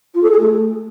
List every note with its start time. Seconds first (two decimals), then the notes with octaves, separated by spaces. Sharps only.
0.14 F4
0.22 A4
0.31 G#4
0.39 A3